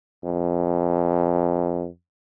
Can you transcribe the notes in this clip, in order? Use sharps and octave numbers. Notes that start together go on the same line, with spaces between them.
F2